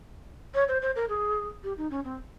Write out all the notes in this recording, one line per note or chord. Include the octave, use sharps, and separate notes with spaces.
C#5
C5
C5
A#4
G#4
G4
D#4
C#4
C4